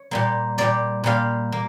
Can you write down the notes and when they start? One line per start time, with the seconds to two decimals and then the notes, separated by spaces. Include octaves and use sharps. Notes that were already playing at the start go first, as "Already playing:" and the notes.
Already playing: C#5
0.11 A#2 G3 A#3
0.58 A#2 G3 A#3 D5
1.04 A#2 G3 A#3 F5
1.52 A#3